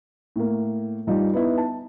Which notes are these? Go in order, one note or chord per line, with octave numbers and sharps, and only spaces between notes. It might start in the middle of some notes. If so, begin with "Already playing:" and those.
A2 A#3
G2 G3 D#4 F4
B3 D#4 E4
A5